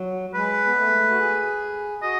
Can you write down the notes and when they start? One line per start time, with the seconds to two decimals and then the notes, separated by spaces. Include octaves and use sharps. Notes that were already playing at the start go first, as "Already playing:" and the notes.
Already playing: F#3
0.34 G#3 B4
0.66 B3
0.77 A3
1.09 F#4
1.19 G#4
2.03 F#4 D#5